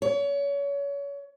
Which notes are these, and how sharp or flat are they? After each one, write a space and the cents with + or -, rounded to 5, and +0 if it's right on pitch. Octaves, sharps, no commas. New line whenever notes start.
C#5 +30